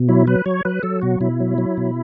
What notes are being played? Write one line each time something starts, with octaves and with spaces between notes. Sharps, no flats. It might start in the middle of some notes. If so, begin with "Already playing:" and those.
Already playing: B2
F#3 E4
F#3 B4
F#3 C#5
F#3 B4
F#3 A4
B2 F#4
B2 E4
F#3
F#3
B2